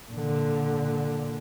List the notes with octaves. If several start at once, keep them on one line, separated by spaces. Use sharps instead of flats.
A#2 D3